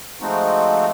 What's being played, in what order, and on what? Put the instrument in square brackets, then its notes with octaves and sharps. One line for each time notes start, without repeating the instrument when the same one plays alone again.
[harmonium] F3 G#3 A3 C4 D#4 F#4